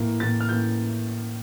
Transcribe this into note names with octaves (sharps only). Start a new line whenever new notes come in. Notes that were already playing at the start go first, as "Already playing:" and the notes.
Already playing: A2 E3 A#3
A2 E3 A#3 A6
F6
A2 E3 A#3 G6